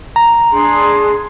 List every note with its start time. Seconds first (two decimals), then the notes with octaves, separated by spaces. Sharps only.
0.16 A#5
0.52 D4 G#4 C6